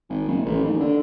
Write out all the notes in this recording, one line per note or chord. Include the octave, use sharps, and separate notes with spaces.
G#1
F#1
A1
D#2
D3